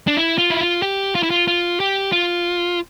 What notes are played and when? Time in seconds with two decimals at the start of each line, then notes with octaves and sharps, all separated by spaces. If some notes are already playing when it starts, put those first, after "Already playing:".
0.07 D4
0.17 E4
0.38 F4
0.50 E4
0.61 F4
0.82 G4
1.15 F4
1.23 E4
1.30 F4
1.48 F4
1.80 G4
2.12 F4